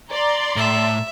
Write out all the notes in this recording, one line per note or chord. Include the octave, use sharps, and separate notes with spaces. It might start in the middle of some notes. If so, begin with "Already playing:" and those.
D5 A#5 C6
A2 E5